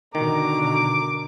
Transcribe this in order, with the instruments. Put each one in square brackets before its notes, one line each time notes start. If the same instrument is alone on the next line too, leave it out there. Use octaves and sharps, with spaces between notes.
[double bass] B2 D3 [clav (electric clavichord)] D#3 [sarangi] A#5 [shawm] D6